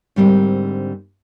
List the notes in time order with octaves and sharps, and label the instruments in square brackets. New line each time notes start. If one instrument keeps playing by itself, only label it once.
[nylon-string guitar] G#2 D3 G3 A#3 C4